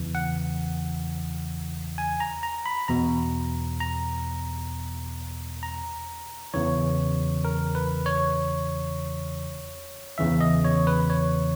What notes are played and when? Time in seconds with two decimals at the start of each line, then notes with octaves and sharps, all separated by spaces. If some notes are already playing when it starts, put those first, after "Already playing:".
Already playing: E2 C#3 E3
0.15 F#5
1.98 G#5
2.20 A#5
2.43 A#5
2.66 B5
2.88 E2 B2 A#5
3.80 A#5
5.63 A#5
6.54 E2 C#3 E3 C#5
7.45 A#4
7.75 B4
8.06 C#5
10.18 E2 C#3 E3 E5
10.41 D#5
10.65 C#5
10.87 B4
11.10 C#5